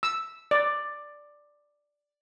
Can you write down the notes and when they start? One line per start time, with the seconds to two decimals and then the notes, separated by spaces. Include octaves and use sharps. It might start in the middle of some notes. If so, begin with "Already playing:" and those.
0.03 E6
0.51 D5